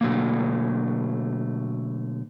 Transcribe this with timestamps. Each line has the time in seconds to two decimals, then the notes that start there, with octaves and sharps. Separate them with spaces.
0.01 B2 D3 D#3 F#3 A3 A#3